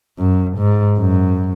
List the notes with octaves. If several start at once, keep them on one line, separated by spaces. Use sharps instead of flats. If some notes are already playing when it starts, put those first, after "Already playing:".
F#2
G#2
F#2